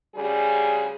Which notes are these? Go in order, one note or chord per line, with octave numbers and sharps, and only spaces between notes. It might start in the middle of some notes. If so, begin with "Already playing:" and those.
D2 C#3 G3 G#4